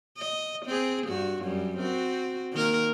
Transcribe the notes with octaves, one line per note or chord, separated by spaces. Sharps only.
D#5
C4 G#4
G2 F#4
F#2 G3
C4 F#4
D#3 A#3 A#4